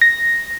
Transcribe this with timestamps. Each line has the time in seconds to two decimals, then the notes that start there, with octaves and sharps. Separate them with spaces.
0.02 A#6